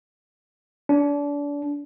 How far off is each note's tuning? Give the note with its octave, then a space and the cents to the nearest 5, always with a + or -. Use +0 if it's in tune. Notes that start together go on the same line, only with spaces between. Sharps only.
D4 -30